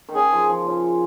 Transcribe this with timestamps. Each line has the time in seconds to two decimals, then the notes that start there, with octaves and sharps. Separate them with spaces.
0.09 D#3
0.15 C#3 G#4
0.32 F3
0.50 F3
0.67 C#3